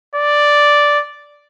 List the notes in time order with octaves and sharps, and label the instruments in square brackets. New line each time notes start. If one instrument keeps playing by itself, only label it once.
[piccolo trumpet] D5